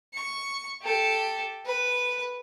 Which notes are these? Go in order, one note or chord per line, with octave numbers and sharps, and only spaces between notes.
C#6
G4 A4
B4